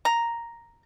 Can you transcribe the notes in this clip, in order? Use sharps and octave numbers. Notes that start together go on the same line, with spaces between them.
A#5